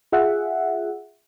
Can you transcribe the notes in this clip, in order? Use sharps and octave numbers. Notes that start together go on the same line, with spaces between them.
F4 G#4 E5 F#5